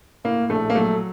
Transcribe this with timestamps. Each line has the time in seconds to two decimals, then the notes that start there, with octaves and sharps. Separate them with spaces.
0.24 A2 A#3
0.50 A#1 A3
0.70 A#3
0.75 F#3 A3